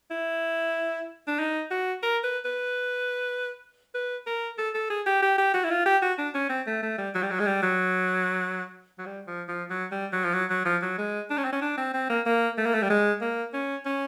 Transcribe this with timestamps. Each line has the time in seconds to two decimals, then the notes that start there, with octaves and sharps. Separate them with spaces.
0.11 E4
1.28 D4
1.39 D#4
1.71 F#4
2.03 A#4
2.24 B4
2.45 B4
3.95 B4
4.26 A#4
4.58 A4
4.75 A4
4.90 G#4
5.06 G4
5.22 G4
5.38 G4
5.54 F#4
5.64 E4
5.71 F4
5.86 G4
6.02 F#4
6.18 D4
6.34 C#4
6.50 C4
6.67 A3
6.83 A3
6.98 G3
7.14 F#3
7.23 G3
7.31 F#3
7.40 G#3
7.46 G3
7.62 F#3
8.98 F#3
9.06 G3
9.27 F3
9.48 F3
9.70 F#3
9.91 G3
10.13 F#3
10.24 F3
10.34 F#3
10.50 F#3
10.65 F3
10.82 F#3
10.98 G#3
11.30 D4
11.38 C#4
11.45 C4
11.53 C#4
11.62 D4
11.78 C4
11.94 C4
12.10 A#3
12.26 A#3
12.58 A3
12.66 A#3
12.74 A3
12.82 G3
12.90 G#3
13.21 A#3
13.54 C#4
13.85 C#4